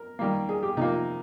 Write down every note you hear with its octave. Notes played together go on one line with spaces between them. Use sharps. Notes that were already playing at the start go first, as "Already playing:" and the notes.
Already playing: A#4
D#3 G3 A#3
G#4
G4
C3 F3 A#3 D#4